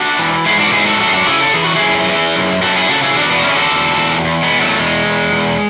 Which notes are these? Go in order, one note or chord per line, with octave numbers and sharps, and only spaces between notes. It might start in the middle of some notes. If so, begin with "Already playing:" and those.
Already playing: D4 F#4
E3
G#2 E4 G#4
D4 F#4
G#2 E4 G#4
F#4 A4
F#2 F#4 A4
G#4
D4 F#4
C#3 E4 G#4
A4
E3 G#4
F#4
E4 G#4
F#2
E3
F#2
F#2 F#4 A4
E4 G#4
C#3 F#4 A4
E4 G#4
E2 D4 F#4
B3 D4
F#4
D3 C#4 E4
G#4
F#4 A4
E2
E2
E2
G#3 B3
E2
F#3 A3
E2 G#3
E2
E2